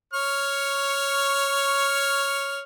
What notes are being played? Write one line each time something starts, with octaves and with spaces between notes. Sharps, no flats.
C#5 C#6 F6